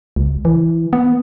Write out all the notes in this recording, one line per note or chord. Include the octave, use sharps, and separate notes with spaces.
C#2
E3
B3